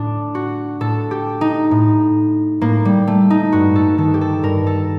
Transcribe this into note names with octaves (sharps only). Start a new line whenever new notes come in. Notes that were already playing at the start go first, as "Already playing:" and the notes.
Already playing: A2 D4
F#4
A2 A4
G4
D#4
A2
A2 A#3
G3
A3
D#4
G2 F#4
A4
D#3 A4
G4
A4
G2 A#4
A4